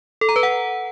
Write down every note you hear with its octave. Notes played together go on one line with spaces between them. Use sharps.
A4
A#5
B4
F#5